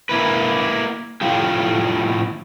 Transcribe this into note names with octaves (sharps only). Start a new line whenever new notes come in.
A#3 E4 B4
A2 F3 F4 G4